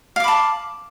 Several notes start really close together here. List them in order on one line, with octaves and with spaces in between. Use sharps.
F5 D6 B5 A5